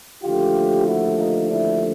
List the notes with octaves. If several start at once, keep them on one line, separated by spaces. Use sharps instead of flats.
D#2 D3 F3 A3 F4 G4
E4 F#4
D#4 F4
D4 E4